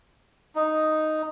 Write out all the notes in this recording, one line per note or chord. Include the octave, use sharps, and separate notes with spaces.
D#4